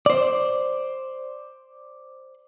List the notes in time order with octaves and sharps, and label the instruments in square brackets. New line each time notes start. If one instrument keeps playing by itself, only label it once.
[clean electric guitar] C5 D5